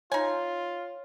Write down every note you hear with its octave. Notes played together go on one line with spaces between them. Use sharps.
D#4 F4 C#5 G#5